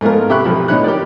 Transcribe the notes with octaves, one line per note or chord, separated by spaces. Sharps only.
G#2 A3 B3 F4 A#4
C3 G4 E5 B5 C#6 F#6
B1 F3 B5
A2 B3 D#4 C#5 B5 F#6
G4 A#4 C#5 D5